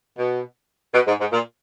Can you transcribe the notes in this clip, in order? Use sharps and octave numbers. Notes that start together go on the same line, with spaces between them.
B2
B2
G#2
G#2
A#2